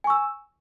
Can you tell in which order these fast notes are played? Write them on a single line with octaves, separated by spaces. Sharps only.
G#5 C#6 E6